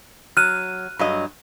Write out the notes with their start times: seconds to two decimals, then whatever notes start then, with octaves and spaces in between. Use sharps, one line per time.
0.37 F#3 F6 F#6 D#7
0.99 G2 F#3 D#5